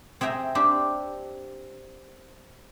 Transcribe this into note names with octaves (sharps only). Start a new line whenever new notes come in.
C4 G#4 E5 G5 A#5
C4 D4 G4 C5